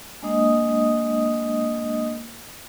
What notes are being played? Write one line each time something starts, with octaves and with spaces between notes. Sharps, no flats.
G#3 A#3 D4 D#5 D#6